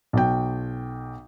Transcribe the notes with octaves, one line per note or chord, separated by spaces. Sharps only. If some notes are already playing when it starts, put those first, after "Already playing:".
B1 G5